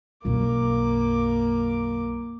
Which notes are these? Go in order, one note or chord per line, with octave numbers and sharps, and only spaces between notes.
B1 F#2 A#3 D6